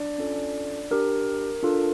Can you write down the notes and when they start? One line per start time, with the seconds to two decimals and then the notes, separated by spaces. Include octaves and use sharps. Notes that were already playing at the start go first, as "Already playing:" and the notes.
Already playing: D4 D5
0.18 C#4 F4 A4
0.91 D4 G4 A#4
1.63 D4 F4 A4